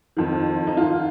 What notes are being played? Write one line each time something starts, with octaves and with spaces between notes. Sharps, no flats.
F2 D#3
D#4
G#2 D#3 F4